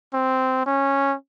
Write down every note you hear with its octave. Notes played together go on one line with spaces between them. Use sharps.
C4
C#4